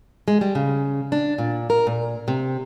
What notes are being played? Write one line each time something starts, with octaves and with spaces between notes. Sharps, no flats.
G#3
G3
C#3
D4
A#2
A#4
A#2
C3